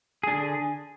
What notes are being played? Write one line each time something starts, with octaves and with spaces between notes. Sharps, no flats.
D3 D4 G#4